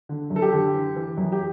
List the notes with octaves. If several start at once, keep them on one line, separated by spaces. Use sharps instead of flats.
D3
F#2
A4
G4
D3
E3
E3
F#2
G4